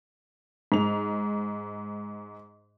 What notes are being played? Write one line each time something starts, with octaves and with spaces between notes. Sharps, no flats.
G#2 F7